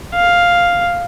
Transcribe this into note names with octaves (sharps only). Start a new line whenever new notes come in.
F5